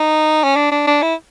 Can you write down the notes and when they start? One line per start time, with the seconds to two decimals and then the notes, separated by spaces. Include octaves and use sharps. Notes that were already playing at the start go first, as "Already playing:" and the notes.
Already playing: D#4
0.44 C#4
0.56 D4
0.71 D4
0.87 D4
1.02 E4